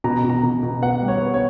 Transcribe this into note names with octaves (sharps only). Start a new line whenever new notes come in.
B2 A#5
B2
A#5
B2
B2
B3 F#5
G3
C#5
B3
C#5